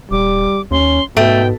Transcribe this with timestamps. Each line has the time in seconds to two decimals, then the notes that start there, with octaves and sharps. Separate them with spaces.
0.11 D#1 G3 D6
0.71 D#2 C#4 C6
1.17 G#2 B2 A3 G5